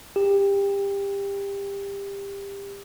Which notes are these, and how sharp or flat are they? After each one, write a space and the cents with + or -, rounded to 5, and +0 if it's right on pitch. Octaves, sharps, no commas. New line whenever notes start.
G4 +20